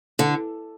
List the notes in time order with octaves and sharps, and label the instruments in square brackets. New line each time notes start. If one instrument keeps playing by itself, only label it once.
[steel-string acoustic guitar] D3